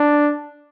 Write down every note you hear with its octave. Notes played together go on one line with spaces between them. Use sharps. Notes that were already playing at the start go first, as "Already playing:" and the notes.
Already playing: D4